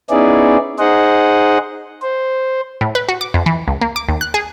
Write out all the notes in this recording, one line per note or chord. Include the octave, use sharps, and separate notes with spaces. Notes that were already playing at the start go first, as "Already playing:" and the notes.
B3 C#4 D#4 E4 G#4 D5
D#4 G#4 C5 D#5 F#5
C5
A2
B4
F#4
D6
F2
E3
C#2
A#3
D6
D#2
F#6
G#4